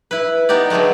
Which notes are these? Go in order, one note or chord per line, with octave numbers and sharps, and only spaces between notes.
E4 B4
B3 D#4 G4 D5
D3 F#3 G#3 A3 B3